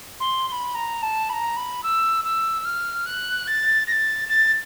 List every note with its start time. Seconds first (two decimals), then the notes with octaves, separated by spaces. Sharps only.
0.20 C6
0.47 C6
0.52 B5
0.75 A#5
1.02 A5
1.29 B5
1.33 A#5
1.56 B5
1.83 E6
2.24 E6
2.65 F6
3.06 F#6
3.47 A6
3.87 A#6
3.92 A6
4.28 A6